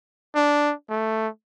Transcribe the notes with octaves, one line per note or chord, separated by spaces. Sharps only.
D4
A3